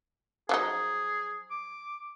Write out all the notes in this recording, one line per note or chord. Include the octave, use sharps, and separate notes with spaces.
F3 F#3 D#4 G#4
D6